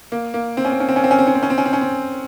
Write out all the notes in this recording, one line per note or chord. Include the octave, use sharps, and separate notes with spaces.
A#3
A#3
C4
C#4
C4
C#4
C4
C#4
C4
C#4
C4
C#4
C4
C#4
C4
C#4
C4
C#4
C4